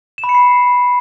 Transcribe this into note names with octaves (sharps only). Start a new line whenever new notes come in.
E7
B5
C#7
C7